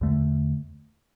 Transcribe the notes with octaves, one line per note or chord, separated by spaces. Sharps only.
E2 D3 A3